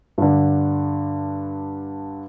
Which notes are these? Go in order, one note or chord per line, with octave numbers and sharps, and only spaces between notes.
G2 D3